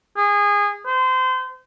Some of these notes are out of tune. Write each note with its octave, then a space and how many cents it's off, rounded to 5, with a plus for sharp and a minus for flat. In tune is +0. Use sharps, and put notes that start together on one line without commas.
G#4 -25
C5 -30